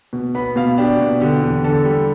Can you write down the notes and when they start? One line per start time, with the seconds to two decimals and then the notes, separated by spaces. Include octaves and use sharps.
0.13 B2
0.35 B3 B5
0.56 B2 F5
0.78 D4 G4
1.00 B2
1.20 D3 G4
1.42 E2
1.64 D3 A4
1.85 G3